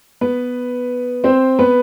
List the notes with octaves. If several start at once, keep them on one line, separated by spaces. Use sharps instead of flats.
B3 B4
C4 C5
B3 B4